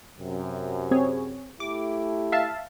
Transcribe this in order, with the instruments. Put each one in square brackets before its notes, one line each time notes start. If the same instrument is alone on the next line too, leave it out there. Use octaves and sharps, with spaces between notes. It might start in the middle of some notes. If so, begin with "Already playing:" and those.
[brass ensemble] F#2 C3
[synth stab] C4 G#4 C#5
[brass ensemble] A3 E4 G4 [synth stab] D6
[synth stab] E5 F5 A5